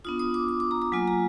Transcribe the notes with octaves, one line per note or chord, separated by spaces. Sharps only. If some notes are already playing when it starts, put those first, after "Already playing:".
B3 D4 F4 D#6
D#6
D6
D6
D6
A#5
A#5
F#3 A#3 F4 G#5
A#5